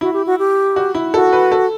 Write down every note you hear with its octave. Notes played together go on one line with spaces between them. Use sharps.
E4 F#4
G4
F#4
G4
F#4
E4
F#4 A4
B4
A4